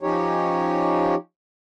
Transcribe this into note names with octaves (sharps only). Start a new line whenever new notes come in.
F3 C#4 D#4 G4 C#5